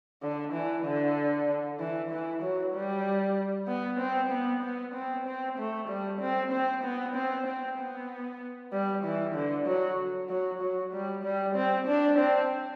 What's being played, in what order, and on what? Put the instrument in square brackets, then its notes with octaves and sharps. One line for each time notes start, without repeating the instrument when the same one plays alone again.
[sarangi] D3
E3
D3
E3
E3
F#3
G3
B3
C4
B3
B3
C4
C4
A3
G3
C4
C4
B3
C4
C4
B3
G3
E3
D3
F#3
F#3
F#3
G3
G3
C4
D4
C4